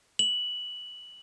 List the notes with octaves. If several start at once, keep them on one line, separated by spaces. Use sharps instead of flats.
F#7